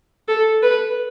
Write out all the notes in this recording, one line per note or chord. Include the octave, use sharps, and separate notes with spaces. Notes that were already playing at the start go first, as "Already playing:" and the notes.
A4
B4